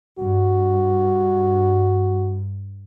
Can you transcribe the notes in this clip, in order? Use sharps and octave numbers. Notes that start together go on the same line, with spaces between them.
G2 F#4